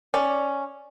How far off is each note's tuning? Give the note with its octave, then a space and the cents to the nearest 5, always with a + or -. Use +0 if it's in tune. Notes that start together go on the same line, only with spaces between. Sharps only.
C#4 +0 D5 +0